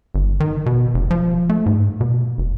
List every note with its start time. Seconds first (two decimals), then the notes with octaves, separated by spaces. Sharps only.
0.15 G1
0.40 D#3
0.66 B2
0.94 F1
1.11 F3
1.49 A3
1.66 G#2
2.01 B2
2.38 F1